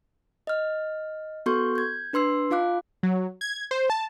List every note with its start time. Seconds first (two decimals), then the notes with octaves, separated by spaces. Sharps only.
0.47 D#5 F6
1.46 B3 F#4 A4 C6 C#6 G6
1.75 G6 G#6
2.13 D4 B4 C6 E6 C7
2.51 D#4 F4 F5 D6 F#6
3.03 F#3
3.41 G#6
3.71 C5
3.90 A5